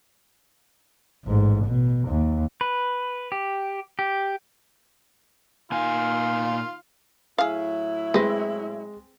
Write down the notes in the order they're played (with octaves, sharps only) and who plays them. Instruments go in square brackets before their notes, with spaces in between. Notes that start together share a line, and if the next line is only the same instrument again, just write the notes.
[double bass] A1 G#2
B2
D#2
[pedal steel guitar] B4
G4
G4
[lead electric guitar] A#2 G#5 [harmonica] D#3 F4 F5
[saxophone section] A2 F#3 E4 [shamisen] G#4 F5
[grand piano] G#3 G#4 A#6 [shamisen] C4 B4